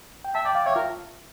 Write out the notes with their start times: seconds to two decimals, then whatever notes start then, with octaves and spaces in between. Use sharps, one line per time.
0.24 G5
0.35 E5 A5
0.45 D5 G5
0.55 D5 F5
0.66 C#5 E5
0.75 F4 A#4